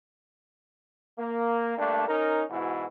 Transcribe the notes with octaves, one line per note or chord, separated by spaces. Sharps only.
A#3
G2 A3 A#3 D4
C#4 D#4 A#4
G#2 B2 E3 E4 F#4